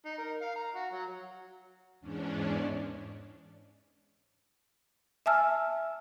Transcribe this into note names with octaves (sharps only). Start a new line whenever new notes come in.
D#4
A#4
F5
A#5
F#4
F#3
E2 G#2 C#4 D4
E5 G#5 A5 E6 F6